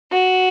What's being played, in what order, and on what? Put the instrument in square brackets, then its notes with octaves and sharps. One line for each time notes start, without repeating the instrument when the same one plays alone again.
[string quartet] F#4